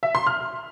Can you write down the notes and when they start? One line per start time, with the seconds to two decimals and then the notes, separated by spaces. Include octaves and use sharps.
0.03 E5
0.15 C6
0.27 F6